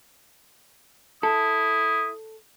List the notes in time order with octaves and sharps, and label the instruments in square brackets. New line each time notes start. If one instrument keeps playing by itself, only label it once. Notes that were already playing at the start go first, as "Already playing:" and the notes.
[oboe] E4 [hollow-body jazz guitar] A4 [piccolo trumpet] D#6